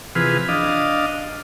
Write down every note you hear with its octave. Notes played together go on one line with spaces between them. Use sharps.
C3 E3 F3 G#4 B4 F6
D4 D#5 F5